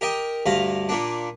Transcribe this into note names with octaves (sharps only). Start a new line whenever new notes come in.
G4 A#4 D#5 G5
D2 G2 F5 A#5
A#2 A#3 D4